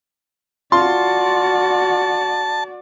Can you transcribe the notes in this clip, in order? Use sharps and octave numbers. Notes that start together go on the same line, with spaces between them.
F4 F#4 D5 A5 C6